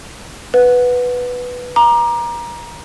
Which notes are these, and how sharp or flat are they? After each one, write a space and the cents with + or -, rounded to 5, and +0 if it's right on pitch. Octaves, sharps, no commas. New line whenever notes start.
B4 +0 F#5 -20
A#5 +20 D6 +30